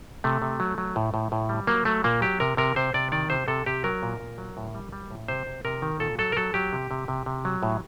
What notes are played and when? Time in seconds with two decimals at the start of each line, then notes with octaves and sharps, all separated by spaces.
0.24 C3 A3
0.42 C3
0.60 F#3
0.78 F#3
0.96 A2
1.14 A2
1.32 A2
1.49 G3
1.67 F#3 A#3
1.85 F#3 A3
2.04 A#2 A#3
2.22 F#3 G4
2.40 C3 A#4
2.57 C3 A#4
2.76 C3 C5
2.94 C3 D5
3.12 D#3 D5
3.30 C3 C5
3.48 C3 A4
3.66 C3 G4
3.84 F#3 A#4
4.03 A#2
4.20 A#2
4.38 F#3
4.57 A2
4.74 G3
4.92 G3
5.11 A2
5.28 C3 C5
5.47 C3
5.65 C3 A#4
5.82 D#3
6.00 A#2 A4
6.19 F#3 A4
6.32 A#4
6.37 F#3 A4
6.54 F#3 G4
6.73 C3
6.91 C3
7.08 C3
7.26 C3
7.45 F#3
7.63 A2